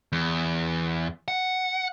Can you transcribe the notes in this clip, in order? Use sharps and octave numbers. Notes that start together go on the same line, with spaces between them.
E2
F#5